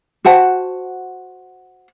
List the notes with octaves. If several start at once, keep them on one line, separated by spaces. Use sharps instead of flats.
F#4 C5 F#5 A5